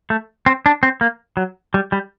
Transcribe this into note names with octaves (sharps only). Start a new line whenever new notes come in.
A3
C4
D4
C4
A#3
F#3
G3
G3